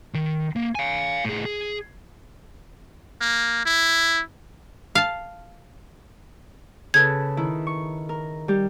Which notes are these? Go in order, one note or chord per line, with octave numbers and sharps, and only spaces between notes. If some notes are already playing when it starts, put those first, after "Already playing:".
D#3
A#3
F5 G#5
A2 G#4
G#4
A#3
E4
F5 A5
C#3 A4 B4 G#6
D#3 E4
C#6
A#4
G3 G4